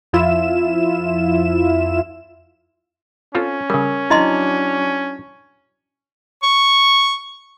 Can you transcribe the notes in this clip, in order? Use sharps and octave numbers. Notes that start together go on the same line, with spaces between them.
F2 F3 E4 F4 E5 E7
C4 C#4 F4 A4
C#3 G3 A#4
F#3 D4 E4 D#5 C6
C#6